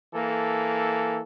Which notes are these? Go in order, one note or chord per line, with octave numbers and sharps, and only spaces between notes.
E3 A#3 A4